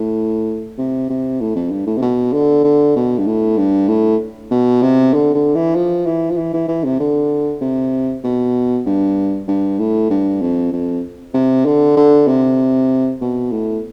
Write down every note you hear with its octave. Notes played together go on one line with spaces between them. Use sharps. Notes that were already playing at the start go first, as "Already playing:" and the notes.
Already playing: A2
C3
C3
A2
F2
G2
A2
C3
B2
D3
D3
B2
G2
A2
G2
A2
B2
C3
D3
D3
E3
F3
E3
F3
E3
E3
E3
C3
D3
C3
B2
G2
G2
A2
G2
F2
F2
C3
D3
D3
C3
B2
A2